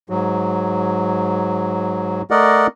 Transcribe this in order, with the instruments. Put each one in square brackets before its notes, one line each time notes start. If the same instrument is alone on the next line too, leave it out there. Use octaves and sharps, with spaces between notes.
[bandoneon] G#2 F#3
A3 A#4 D5 D#5 F#5